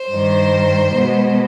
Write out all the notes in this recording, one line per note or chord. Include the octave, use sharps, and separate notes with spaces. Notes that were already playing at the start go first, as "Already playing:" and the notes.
Already playing: C5
G2 D#3 G3
B2 G#3 B3